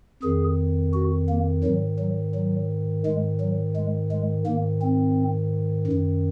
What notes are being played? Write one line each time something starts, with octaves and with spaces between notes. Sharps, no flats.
F2 D#3 G#4
F#4
A#3
G#2 D#3 F#3
F#3
F#3
G#2 D#3 G#3
F#3
G#3
G#3
G#2 D#3 A#3
C4
F#2 D#3